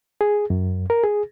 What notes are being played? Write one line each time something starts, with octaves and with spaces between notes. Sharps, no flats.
G#4
F#2
A#4
G#4